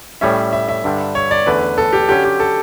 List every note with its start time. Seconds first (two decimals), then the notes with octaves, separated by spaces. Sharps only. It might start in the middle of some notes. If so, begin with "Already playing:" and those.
0.21 A2 G3 C#4 E5
0.53 E5
0.68 E5
0.84 G2 D3 G3 D4
1.15 C#5
1.31 D5
1.46 E2 D3 A3 C#4 B4
1.78 A4
1.93 G4
2.08 D3 F#3 C#4 G4
2.24 G4
2.40 A4